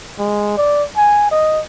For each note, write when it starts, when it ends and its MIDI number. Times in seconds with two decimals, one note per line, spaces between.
0.19 0.57 56
0.58 0.84 74
0.96 1.26 80
1.31 1.61 75